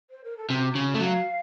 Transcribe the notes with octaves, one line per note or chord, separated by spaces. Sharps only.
C5
A#4
A4
C3 F#4
C#3
A3
F#3 F5